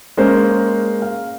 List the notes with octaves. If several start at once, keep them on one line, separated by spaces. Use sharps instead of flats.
G#3 A#3 C#4 C5
F5